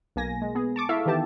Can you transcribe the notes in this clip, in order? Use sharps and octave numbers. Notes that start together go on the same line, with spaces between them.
B1 A#3 G#5 A#6
G#3
B3 G#4
A5 C#6 D6
E4 A4 E5 F5
D#3 E3 B3 G4 A5